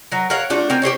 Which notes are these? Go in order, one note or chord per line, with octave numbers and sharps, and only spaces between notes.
F#3 A#4
A#4 C#5 F5 F#5
A3 D4 F4 F#4
C4 A#4 G#5
G4 G#4 C5 C#5